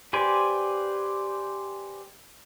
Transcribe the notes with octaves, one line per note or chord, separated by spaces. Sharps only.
G4 B4 C5 D5 G#5